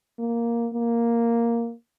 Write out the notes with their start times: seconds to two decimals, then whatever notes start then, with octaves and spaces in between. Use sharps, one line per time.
0.19 A#3
0.74 A#3